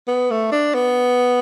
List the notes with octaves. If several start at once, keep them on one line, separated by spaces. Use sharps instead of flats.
B3
A3
D4
B3